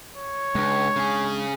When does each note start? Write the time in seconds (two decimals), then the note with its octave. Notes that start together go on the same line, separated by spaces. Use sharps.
0.17 C#5
0.55 C#2 G#3 D4
0.96 C#3 G#4